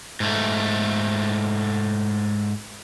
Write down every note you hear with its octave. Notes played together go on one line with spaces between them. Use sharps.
G#2 A3